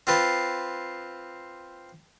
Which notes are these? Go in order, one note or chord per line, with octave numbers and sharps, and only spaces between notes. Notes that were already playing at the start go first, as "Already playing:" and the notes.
C4 F4 B4 A5